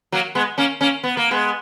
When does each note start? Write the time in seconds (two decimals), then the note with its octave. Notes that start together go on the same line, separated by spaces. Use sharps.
0.12 F#3 A#3
0.35 G#3 B3
0.58 A#3 C#4
0.81 A#3 C#4
1.03 B3
1.17 A#3
1.31 G#3 B3